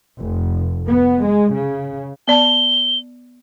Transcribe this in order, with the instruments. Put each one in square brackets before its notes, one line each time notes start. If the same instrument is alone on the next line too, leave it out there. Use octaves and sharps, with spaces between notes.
[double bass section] F1
B3
G#3
C#3
[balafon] B3 D5 A5 [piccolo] G7